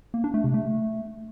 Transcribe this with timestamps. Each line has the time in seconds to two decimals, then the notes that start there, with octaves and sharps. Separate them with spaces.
0.14 A#3
0.24 D4
0.34 A3
0.44 C3
0.54 A3